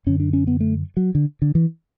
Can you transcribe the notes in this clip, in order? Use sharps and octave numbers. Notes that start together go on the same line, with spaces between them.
F#2 D3 C#4
D4
C#4
B3
A3
F#3
D3
D3
E3